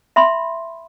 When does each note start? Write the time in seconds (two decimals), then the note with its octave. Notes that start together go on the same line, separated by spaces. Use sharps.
0.16 E5 B5 C6